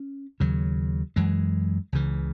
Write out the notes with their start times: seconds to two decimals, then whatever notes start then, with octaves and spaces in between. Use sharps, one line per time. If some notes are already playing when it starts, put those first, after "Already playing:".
Already playing: C#4
0.40 D#2 C#3 F#3
1.16 F#2 E3 G#3
1.92 C#2 C#3 E3